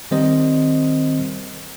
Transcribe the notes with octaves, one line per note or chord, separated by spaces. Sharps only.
D#3 G3 C4 A#4 C5 D#5